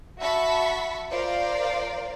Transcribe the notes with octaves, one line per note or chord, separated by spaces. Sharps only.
F#4 E5 A5 B5 C#6 B6
F4 A#4 C5 D5 F5